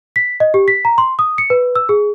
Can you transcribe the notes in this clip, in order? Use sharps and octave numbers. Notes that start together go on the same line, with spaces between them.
B6
D#5
G4
B6
A#5
C6
D#6
C#7
B4
E6
G#4